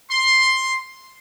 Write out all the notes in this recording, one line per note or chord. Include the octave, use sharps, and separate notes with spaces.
C6